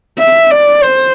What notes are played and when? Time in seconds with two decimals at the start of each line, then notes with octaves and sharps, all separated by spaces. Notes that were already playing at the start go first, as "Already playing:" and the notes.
0.19 E5
0.51 D5
0.83 C5